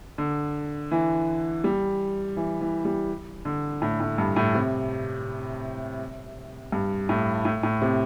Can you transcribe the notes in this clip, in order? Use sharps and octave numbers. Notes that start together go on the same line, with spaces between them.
D3
E3
G3
E3
E3
G3
D3
A2
A2
G2
A2
C3
G2
A2
A2
A2
C3